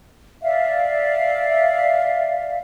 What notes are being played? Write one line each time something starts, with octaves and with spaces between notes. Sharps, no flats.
D5 E5 F5